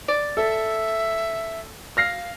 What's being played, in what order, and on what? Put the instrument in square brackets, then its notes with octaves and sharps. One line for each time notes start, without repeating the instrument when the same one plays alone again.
[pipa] D5
[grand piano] A4 [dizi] E5
[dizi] F5 [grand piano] F6 A#6 C7